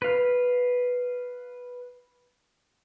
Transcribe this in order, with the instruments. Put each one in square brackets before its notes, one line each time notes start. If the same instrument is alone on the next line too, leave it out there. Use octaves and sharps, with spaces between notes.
[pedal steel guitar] B4 F5